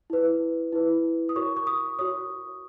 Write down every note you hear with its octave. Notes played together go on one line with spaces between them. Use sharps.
E4 B4
E4 B4
D#6
F#4 A#4 C#5 C#6
C#6
D#6
F#4 A#4 C#5 D#6